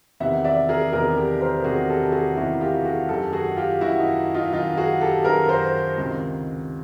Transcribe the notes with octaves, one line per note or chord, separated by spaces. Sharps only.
E2 C3 D#3 E5 F#5
D5 E5
G#4 A#4
E2 C3 D#3 G#4 A#4
G4 A4
A#4 C5
E2 C3 D#3 F#4 G#4
G4 A4
G4
F#4 G#4
E2 C3 D#3 E4 F#4
F4 G4
F#4 G#4
F#2 D#3 G4 A4
F#4 G#4
F4 G4
F#2 D#3 E4 F#4
D#4
D#4 F4
F#2 D#3 D#4 F4
F#4 G#4
G4 A4
F#2 D#3 G#4 A#4
A#4 C5
C#2 C3 D#3